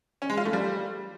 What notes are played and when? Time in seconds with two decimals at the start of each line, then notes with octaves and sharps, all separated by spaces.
0.22 C#4
0.30 G#3
0.37 F4
0.45 A3
0.53 G3